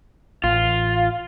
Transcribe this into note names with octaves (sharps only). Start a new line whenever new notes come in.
A1 F4